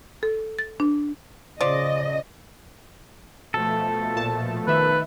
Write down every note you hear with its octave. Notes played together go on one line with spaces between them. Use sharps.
A4
A6
D4
C#3 F3 D5 D#5
B2 F3 A3 A4
A#2 A5
D#3 B4 E5